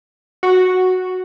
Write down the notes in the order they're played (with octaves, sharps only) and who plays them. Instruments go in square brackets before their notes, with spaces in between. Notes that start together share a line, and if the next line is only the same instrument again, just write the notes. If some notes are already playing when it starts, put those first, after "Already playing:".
[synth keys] F#4